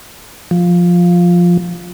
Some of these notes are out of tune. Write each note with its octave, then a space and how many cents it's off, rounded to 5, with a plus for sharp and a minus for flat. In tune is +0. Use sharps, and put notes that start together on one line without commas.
F3 +5